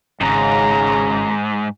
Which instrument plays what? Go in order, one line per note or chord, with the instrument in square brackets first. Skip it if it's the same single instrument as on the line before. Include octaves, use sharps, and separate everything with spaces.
[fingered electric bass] G#1 [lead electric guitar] F2 G#2 [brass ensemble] C#3 [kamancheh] A#5